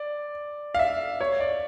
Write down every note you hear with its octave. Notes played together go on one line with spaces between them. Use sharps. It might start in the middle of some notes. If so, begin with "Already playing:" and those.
Already playing: D5
F5
E5
C#5
D5